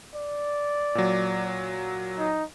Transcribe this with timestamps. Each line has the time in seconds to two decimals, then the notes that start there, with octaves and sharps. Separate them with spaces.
0.15 D5
0.95 A#2 F#3
2.18 D#4